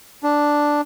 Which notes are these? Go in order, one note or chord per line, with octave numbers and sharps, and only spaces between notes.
D4